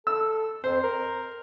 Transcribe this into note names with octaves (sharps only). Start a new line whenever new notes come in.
A4 E6
F2 C5
A#4